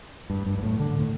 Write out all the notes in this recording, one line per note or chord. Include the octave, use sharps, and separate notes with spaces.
G2
G2
G2
A2
D3
A2